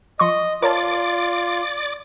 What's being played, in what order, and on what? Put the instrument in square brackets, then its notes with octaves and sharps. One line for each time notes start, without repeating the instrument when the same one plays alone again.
[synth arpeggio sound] F3 C6 C#6 [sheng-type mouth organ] D#5
[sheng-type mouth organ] F4 [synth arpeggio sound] A#4 C#5 A5 [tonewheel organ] D5 D6